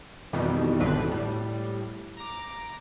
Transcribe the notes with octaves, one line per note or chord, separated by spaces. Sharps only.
F2 B2 D#3 E3 G3
G#1 E2 B2 D3 C4 B4
A2 G3
A#5 D6